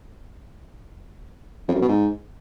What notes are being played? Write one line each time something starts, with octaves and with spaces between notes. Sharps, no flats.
F2
F#2
B2
G#2